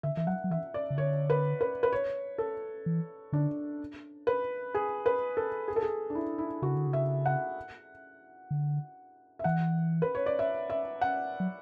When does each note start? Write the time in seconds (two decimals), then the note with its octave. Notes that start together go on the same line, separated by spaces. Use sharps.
0.03 D3 E5
0.17 E3 E5
0.27 F#3 F#5
0.44 F#3
0.51 E3 E5
0.74 D5
0.90 C#3
0.97 D3 C#5
1.30 B4
1.61 B4
1.83 B4
1.93 C#5
2.38 A4
2.86 E3
3.33 D3 D4
4.27 B4
4.74 G#4
5.06 B4
5.37 A4
5.68 G#4
5.76 A4
5.83 G#4
6.10 D4
6.15 E4
6.38 E4
6.62 C#3 F#4
6.76 D3
6.87 C#3
6.93 E5
7.26 F#5
8.51 D3
9.39 E5
9.44 E3 F#5
10.02 B4
10.15 C#5
10.26 D5
10.39 E5
10.70 E5
11.01 F#5
11.40 F#3